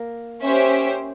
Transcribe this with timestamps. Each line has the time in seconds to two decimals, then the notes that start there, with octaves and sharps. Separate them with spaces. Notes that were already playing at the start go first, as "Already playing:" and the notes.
Already playing: A#3
0.44 C#4 G4 C5 E5